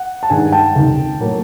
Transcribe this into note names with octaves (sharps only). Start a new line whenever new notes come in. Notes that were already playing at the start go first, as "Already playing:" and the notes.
Already playing: F#5
A5
G2 D#3 G#3 F#5 G#5
G5 A5
C#2 C3 D#3
A2 F#3 A#3